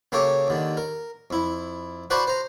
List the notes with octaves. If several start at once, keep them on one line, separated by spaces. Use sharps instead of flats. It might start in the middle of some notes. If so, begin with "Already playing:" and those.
C#3 A#3 G4 A4 C#5 D6
D#2 D3 D#3
A#4
F2 E4
F#4 C5 D5 F#5 A5 B5
C5 A#5